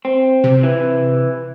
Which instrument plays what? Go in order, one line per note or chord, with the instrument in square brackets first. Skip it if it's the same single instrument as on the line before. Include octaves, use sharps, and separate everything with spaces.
[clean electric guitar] C4
[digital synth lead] C3
[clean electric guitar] E3